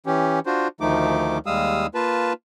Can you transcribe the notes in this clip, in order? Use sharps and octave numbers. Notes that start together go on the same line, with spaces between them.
E3 C#4 G4
D4 F4 F#4 C5
D2 D#3 F3 A3 D#4 D6
D#2 G3 G#3 F5 D#6 E6
A#3 F4 B4 A5